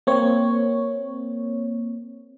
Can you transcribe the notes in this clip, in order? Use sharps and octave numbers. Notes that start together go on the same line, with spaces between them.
A#3 C4 C#5